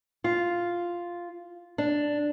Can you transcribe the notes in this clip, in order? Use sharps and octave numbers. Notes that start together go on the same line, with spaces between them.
F4
D4